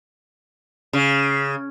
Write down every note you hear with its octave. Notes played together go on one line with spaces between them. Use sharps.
C#3